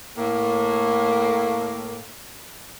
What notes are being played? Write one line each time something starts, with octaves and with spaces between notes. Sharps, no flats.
A2 A#3